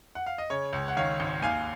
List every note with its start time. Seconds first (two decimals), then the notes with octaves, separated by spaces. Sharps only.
0.15 F#5
0.27 F5
0.38 D#5
0.50 C#3 C#5
0.73 C#2
0.88 F#5
0.97 D#3 C#5 F5
1.20 G#1
1.42 D#2 F5 G#5